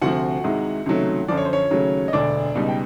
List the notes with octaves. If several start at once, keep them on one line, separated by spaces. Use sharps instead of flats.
D2 C3 F3 F#4 F#5
C2 C3 D#3 G#3
C#2 C3 D#3 F#3 A3
F#2 D3 F3 D5
C#5
C5
C#4 C#5
D#2 C#3 F#3 A3
D#5
E1 D2 D3 D4 D5
C#2 B2 G3 D#4 D#5
G5